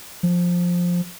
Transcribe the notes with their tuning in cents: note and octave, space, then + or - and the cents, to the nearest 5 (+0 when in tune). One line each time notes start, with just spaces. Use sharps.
F3 +10